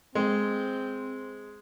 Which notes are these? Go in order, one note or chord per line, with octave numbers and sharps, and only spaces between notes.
G#3 C4